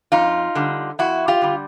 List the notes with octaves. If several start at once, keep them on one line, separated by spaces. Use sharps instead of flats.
F2 D#4 F4
D3 G3
F2 E4 F#4
F4 G4
D3 G3